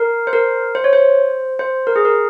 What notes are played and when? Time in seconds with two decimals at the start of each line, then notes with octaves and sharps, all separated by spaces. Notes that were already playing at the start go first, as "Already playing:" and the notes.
Already playing: A#4
0.27 C5
0.33 A#4
0.75 C5
0.84 C#5
0.93 C5
1.59 C5
1.87 A#4
1.96 G#4
2.05 A#4